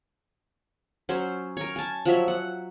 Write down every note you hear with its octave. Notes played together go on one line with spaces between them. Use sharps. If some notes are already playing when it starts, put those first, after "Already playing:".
F#3 C#4 C5
A#4 C#5
G#5 A5
F3 F#3 E5
F#5